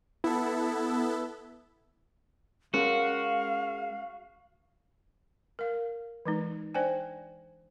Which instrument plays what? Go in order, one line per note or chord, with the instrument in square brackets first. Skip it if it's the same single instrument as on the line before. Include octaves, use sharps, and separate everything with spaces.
[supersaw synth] B3 A4 [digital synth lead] E4
[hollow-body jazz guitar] G#3 C#4 A#4 [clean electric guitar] F#4 [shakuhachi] F5
[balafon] A#4 F5
E3 G#3 D#4
D4 C5 D5 G5 G#5